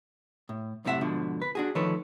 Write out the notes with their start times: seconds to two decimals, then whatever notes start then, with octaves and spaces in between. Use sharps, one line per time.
0.49 A2
0.85 F#2 A2 C3 F4 E5 F#5
1.01 G#2 B2 D3 F3
1.42 B4
1.55 D4 F#4 G#4
1.75 D2 D#3 F3 A4 B4 C#5